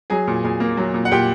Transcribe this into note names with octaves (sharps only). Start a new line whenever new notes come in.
F#3 G#4 G#5
A#2
A#2 G#4 G#5
A#3
F#3
A#2
F#5
A#2 G4 G5